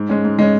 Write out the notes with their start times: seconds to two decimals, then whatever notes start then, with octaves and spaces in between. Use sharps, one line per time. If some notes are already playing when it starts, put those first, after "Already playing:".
Already playing: G#2
0.09 G#3 C#4
0.24 G#2
0.39 G#3 C#4